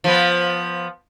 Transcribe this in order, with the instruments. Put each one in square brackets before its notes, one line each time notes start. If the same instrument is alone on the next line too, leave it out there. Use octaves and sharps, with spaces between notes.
[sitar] F3 B3